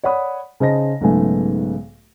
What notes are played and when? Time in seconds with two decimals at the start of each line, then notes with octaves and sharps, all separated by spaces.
0.04 C#5 D5 F#5 B5 D#6
0.60 C#3 D#4 C5 D#5 A5 A#6
1.01 B1 G#2 C#3 A3 B3 G#5